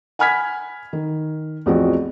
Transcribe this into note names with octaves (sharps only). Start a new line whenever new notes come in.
F#5 G#5 B5 F6 G#6 B6
D#3
A1 E2 F3 C4 F#4